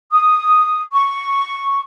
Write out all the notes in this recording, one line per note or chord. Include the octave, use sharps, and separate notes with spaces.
D#6
C#6